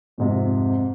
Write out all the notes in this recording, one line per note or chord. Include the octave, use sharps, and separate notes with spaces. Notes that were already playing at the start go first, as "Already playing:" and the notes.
F2 G#2 C3